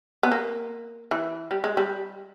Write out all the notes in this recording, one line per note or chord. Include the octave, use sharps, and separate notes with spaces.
B3
A#3
E3
G3
G#3
G3